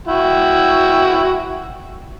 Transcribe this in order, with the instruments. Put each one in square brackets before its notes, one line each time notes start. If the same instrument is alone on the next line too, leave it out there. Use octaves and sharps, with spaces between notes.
[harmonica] E4 F#4 G5